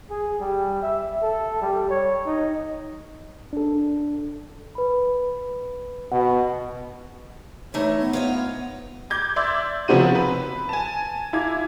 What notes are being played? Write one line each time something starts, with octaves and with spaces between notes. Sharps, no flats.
G#4
G3
E5
A4
G3
C#5
D#4
D4 A4
B4 B5
B2 F#5
E3 A3 D#4 C#5
B3
F4 C#5 D#5
D6 G6 G#6
D5 E5 C6 D6 E6
C#3 F3 B3 C4 F#4 D#7
B4
G#5 A5
E4 F4 D6 G#6